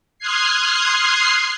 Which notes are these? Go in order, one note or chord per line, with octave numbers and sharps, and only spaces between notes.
C6 D#6 F6 F#6 G#6 C7